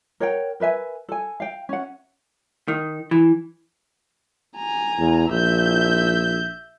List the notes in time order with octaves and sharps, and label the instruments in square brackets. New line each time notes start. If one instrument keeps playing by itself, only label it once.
[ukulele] A#4 C#5 F#5 G5
A#4 B4 E5 G#5
A4 G#5
F5 G5
C#4 F#5
[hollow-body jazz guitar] D#3
E3
[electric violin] G#5 A#5
[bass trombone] E2
[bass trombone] A#1 [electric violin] E5 G6